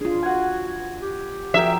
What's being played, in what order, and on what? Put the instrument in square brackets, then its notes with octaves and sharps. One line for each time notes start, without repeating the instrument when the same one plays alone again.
[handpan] D4 F4 [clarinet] G#4
[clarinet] F#4 [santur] F#5 G#5
[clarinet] G4
[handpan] F3 F#4 [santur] G#4 A#4 G5 [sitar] E5